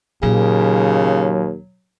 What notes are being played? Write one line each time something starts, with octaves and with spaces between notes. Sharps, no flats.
D#2 A#2 C#3 F#3